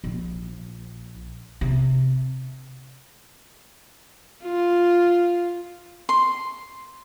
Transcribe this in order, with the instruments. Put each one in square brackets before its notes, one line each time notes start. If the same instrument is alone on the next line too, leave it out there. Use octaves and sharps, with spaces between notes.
[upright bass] A#1
C3
[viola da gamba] F4
[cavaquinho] C6